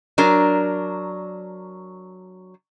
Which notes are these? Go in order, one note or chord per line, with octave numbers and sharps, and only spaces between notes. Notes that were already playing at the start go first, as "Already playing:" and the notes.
F#3 D4 A#4